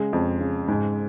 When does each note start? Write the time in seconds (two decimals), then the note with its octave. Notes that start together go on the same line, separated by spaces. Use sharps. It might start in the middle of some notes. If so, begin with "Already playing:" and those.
Already playing: C#3 G#3
0.13 F2
0.41 C#3
0.68 G#2